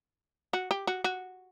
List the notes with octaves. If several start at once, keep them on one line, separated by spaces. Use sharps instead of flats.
F#4
G4
F#4
F#4